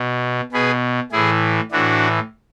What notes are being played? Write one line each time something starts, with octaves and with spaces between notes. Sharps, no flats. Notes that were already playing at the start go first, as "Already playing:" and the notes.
Already playing: B2
B2 G#4 B4
A2 E3 E4 G#4
A2 E3 D4 F#4